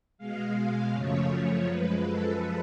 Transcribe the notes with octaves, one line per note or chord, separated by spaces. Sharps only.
B2 G#3 F5
F#2 C#3 F3 A3 C#5
C#5
F#2 F3 G#3 B4
A4